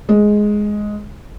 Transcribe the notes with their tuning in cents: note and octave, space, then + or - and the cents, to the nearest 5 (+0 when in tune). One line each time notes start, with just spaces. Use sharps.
G#3 +5